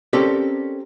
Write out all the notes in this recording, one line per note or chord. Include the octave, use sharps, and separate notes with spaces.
C4 C#4 G4 A4 A#4 D5